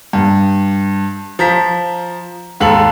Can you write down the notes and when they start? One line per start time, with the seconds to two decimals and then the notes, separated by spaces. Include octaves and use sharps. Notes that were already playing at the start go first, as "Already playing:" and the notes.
0.13 G2
1.39 F3 A#5 B6
2.60 D#2 G#2 A4 F#7